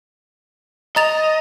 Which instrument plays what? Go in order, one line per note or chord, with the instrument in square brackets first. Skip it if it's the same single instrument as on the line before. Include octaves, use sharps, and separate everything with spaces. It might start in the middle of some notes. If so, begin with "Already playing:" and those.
[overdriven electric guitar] D#5 [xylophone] A#5 A6 F7